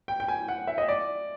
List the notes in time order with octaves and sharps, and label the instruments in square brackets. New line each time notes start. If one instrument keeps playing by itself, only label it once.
[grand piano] G5
G5
G#5
F#5
E5
D#5
D5